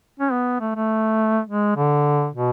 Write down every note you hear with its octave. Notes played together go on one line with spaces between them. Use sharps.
C#4
B3
A3
A3
G#3
D3
B2